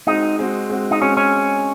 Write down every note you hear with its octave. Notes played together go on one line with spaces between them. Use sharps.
G#3 C4 D#4 F#4
G#3 C4 F#4
G#3 C4 F#4
D#4
G#3 C4 C#4 F#4
C#4